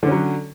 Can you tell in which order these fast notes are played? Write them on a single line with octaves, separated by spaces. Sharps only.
D3 C#4 F#3